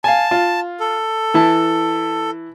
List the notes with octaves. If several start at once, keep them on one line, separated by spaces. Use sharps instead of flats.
F5 G#5 A5
F4
A4
E3 E4 A5